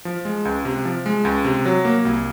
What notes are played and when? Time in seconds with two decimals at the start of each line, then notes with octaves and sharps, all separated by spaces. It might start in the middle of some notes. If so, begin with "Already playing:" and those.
0.05 F3
0.25 G#3
0.45 C#2
0.65 C3
0.85 F3
1.06 G#3
1.25 C#2
1.44 C3
1.65 F#3
1.85 A#3
2.05 C2